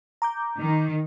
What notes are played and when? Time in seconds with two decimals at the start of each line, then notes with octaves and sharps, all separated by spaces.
0.22 A#5 D6 G6
0.59 D#3